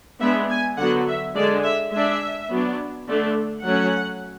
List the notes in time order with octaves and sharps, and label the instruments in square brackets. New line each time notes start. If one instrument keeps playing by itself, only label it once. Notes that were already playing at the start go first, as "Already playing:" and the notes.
[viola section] G#3 B3 D4 E5
G#5
D3 F#3 B3 F#5
E5
D3 G#3 D4 D5
E5
G#3 D4 E5
F#3 B3 D4
D3 A3 D4
F#3 A3 C#4 F#5